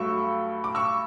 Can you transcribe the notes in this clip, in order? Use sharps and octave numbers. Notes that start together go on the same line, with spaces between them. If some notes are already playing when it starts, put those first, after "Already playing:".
Already playing: G2 F#3 A3 C#6 E6
D6
C#6 E6